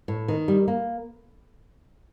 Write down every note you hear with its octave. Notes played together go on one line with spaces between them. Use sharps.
A2
D#3
G3
A#3